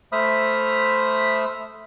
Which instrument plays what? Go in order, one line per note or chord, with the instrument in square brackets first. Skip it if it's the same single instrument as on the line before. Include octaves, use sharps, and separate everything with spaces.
[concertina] A3 C5 E5 B5 D#6 F6